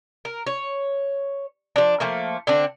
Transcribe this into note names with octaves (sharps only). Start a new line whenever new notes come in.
A#4
C#5
F3 D4
F3 A3 A#3
D3 C4 D4